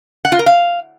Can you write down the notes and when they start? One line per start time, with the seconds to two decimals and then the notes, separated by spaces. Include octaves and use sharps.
0.25 F#5
0.32 F4
0.39 A#4
0.46 F5